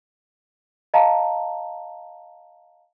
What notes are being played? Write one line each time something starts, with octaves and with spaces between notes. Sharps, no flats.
D#5 F5 A5 A#5